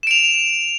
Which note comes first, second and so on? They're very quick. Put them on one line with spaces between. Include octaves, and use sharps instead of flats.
E7 D7 F7